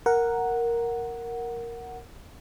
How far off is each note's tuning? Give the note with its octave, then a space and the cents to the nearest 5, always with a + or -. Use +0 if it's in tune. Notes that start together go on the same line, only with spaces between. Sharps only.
A#4 +0 F#5 +0